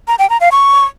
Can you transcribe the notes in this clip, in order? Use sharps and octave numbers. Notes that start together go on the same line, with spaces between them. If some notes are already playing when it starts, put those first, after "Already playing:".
A#5
G5
A#5
F5
C#6